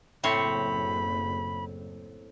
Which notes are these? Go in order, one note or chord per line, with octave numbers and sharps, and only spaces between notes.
F#1 A2 C4 C#5 B5